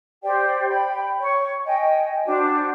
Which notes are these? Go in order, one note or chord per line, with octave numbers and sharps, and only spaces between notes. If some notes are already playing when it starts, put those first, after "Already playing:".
G4 C5 D5 G5
G5 B5
C#5 C#6
D#5 G5 G#5
D4 F#4 C5